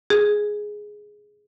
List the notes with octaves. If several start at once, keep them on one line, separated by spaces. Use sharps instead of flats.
G#4